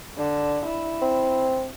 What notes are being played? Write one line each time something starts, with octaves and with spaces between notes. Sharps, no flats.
D3
E4
C4